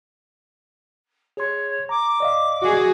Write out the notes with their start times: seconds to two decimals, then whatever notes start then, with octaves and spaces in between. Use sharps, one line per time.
1.37 G#4 C#5 C6
1.89 A#5 D6
2.20 D5 D#5 F5
2.62 F#4 G#4